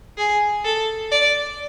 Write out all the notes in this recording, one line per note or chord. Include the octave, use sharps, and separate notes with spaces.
G#4
A4
D5